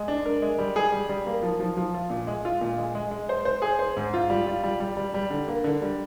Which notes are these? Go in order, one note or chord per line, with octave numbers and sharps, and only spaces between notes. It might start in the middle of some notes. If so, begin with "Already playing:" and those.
Already playing: G#3
D4
A#4
G#3
G3
G#4
G3
G3
A#3
F3
F3
F3
F4
A#2
G#3
F4
A#2
G#3
G#3
G#3
C5
C5
G#4
C5
G#2
F4
G3
F4
G3
G3
G3
G3
D3
A#3
D3
G3